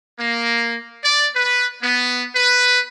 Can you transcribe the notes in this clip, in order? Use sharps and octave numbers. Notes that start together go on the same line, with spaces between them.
A#3
D5
B4
B3
B4